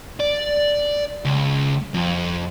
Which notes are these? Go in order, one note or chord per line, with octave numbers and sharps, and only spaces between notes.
D5
C#2
F2